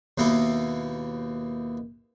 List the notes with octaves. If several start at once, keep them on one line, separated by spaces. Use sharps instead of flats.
D#2 B2 A#3 E4 A4